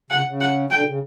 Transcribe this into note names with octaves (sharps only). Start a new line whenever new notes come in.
C#3 F#5
C#3
F#5
D3 G5
B2
C#3